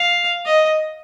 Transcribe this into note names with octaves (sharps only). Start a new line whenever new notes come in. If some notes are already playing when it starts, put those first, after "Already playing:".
Already playing: F5
D#5